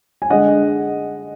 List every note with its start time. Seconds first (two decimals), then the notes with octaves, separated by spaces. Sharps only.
0.22 G#5
0.30 D3 G#3 D#5 F#5